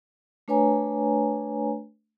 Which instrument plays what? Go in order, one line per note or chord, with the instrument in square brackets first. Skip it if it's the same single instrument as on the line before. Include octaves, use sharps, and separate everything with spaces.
[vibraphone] A3 D4 B4 C#5 G#5 A#5